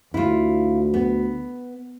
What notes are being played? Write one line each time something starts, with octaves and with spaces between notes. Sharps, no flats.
D2 E4 F4
B3